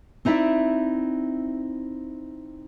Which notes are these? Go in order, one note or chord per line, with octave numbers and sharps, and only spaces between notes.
C4 D#4 E4 D5 E5